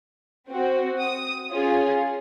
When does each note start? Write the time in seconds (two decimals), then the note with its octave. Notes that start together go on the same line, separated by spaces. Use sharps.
0.48 C4 F#4
0.99 D#6
1.52 C#4 F4 G#4